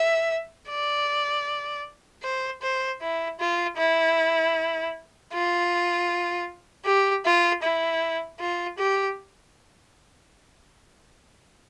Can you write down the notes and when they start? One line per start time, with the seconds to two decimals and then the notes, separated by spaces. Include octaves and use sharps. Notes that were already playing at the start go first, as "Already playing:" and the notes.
Already playing: E5
0.70 D5
2.23 C5
2.62 C5
3.01 E4
3.40 F4
3.77 E4
5.33 F4
6.86 G4
7.25 F4
7.63 E4
8.40 F4
8.78 G4